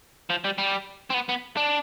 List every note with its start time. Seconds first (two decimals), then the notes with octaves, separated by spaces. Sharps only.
0.30 F3
0.44 G3
0.58 G3
1.10 C4
1.14 B3
1.29 B3
1.57 D4